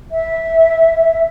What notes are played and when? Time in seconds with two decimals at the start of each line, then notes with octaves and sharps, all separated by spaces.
0.11 E5